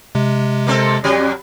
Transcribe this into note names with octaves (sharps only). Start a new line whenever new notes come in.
C3 G#3
A#3 C4 A4
F2 F#3 G3